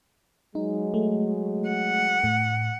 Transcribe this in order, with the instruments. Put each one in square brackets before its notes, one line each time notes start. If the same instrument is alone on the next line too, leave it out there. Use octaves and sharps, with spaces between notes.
[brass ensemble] F#3 G#3 [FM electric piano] D#4
[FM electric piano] A3
[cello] F#5
[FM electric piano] A2